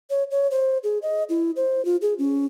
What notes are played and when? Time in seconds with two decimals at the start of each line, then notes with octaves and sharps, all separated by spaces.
0.10 C#5
0.31 C#5
0.51 C5
0.84 G#4
1.02 D#5
1.29 E4
1.56 C5
1.85 F4
2.02 G#4
2.19 C#4